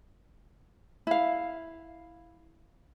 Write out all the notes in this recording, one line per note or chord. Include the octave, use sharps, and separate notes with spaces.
E4 F5